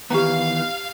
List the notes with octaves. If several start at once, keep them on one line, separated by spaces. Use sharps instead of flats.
D#3 E3 B3 G4 F5 A#5